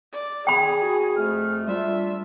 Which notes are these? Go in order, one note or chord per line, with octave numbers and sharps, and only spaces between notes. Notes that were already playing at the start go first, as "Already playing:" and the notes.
D5
G#4 G5 B5
F#4
F2 A3 F6
G3 D4 F4 E5